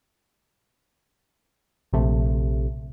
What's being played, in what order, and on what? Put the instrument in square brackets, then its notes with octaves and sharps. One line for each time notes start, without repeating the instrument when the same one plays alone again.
[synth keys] A#1 C3 A3